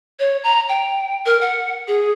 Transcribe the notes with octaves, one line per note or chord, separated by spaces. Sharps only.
C#5
A#5
G5
A#4
F#5
G#4